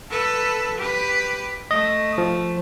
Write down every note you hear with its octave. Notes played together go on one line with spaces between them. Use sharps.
A4 B4
G4 B4
A3 D#5
F3